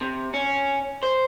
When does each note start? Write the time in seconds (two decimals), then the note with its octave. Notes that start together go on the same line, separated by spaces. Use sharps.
0.01 C3
0.34 C#4
1.03 C5